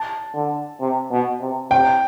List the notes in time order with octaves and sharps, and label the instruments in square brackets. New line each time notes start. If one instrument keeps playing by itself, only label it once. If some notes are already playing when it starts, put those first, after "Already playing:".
Already playing: [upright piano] A5
[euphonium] D3
C3
B2
C3
[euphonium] C3 [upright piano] G5